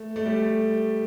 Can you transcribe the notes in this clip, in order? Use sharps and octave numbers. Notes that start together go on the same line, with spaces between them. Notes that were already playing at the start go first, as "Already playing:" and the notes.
Already playing: A3
A3
G3